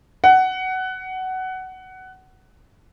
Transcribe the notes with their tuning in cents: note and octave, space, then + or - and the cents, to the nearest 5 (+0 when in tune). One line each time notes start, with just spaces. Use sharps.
F#5 +15